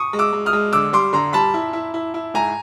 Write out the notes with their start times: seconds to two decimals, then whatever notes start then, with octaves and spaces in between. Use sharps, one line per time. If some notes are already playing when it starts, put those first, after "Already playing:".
Already playing: C#6 D#6
0.13 G#3
0.19 D6 E6
0.33 G#3
0.46 D#6 F6
0.53 G#3
0.73 D3 D6 E6
0.93 G3 C6 D6
1.13 D3 A#5 C6
1.33 G3 A5 B5
1.54 E4
1.73 E4
1.94 E4
2.14 E4
2.34 G#2 G#5 A#5